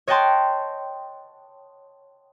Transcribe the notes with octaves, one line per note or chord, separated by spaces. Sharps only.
C#5 D#5 F#5 G5 A5 C6